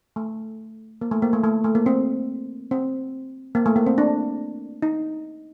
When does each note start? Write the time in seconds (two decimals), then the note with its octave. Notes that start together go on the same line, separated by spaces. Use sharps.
0.16 A3
1.01 A#3
1.11 A3
1.22 A#3
1.33 A3
1.44 A3
1.64 A3
1.75 A#3
1.86 C4
2.71 C4
3.55 A#3
3.66 A3
3.76 A#3
3.86 C4
3.98 D4
4.82 D#4